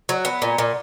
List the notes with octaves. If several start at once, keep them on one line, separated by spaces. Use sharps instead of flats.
F#3
B3
A#2
A#2